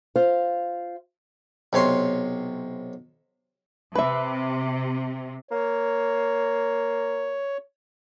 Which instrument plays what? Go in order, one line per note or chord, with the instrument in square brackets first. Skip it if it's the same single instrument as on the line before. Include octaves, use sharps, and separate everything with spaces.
[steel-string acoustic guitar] F4 C5 F5
[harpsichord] B1 C3 C#5 C6
[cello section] C3 [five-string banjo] B4 E5
[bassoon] A#3 [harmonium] C#5